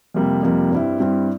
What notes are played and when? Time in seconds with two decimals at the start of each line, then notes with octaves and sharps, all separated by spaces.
0.14 F2 C3 G3 A#3
0.43 F2 C3 G3 A#3
0.71 G2 G3 C4 E4
1.00 G2 G3 C4 E4